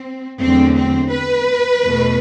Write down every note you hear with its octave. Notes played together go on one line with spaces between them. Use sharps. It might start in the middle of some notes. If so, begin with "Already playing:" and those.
Already playing: C4
E2 D3 F#3 A3 C4
C4
B4
E2 B2 A3